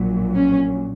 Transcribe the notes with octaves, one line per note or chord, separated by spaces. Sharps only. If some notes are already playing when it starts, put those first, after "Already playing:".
Already playing: A#1 A#2 F#3
C#4